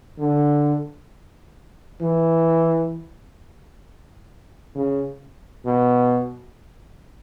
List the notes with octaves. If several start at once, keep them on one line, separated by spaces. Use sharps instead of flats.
D3
E3
C#3
B2